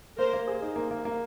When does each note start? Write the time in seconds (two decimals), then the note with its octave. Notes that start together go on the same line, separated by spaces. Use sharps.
0.18 A#3 A#4 C5
0.33 A#3
0.47 G#4
0.62 D#4
0.76 A#3
0.91 A#3
1.05 A#3